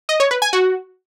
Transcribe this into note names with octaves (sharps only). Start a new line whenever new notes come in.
D#5
C#5
B4
G#5
F#4